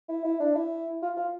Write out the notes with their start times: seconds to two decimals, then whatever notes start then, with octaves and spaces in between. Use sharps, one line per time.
0.09 E4
0.25 E4
0.40 D4
0.55 E4
1.02 F4
1.17 F4